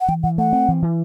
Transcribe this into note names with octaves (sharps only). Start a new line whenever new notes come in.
F#5
E3 G5
E3 F#5
A3 F#5
C4
E3
E3